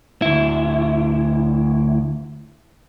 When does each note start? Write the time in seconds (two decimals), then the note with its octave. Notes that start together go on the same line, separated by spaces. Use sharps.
0.22 D2 E4